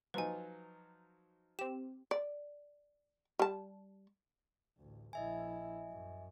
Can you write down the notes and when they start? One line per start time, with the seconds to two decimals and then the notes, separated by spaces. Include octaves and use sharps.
0.14 F3 F#3 D#4 B4 G#5
1.59 C4 G4 E7
2.11 D5
3.39 G3 A5
4.78 A1 D2
5.13 A#1 E4 D#5 E5 G#5
5.90 F#2